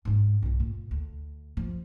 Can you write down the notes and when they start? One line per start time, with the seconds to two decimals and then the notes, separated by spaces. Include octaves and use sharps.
0.05 G#2 G#3
0.42 B1 G2
0.60 A#2
0.91 D2
1.57 F3